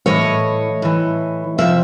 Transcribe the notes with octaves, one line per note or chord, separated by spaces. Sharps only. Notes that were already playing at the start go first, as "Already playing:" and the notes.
A2 E3 C#5 D#5
A2 E3
F2 C3 F3 E5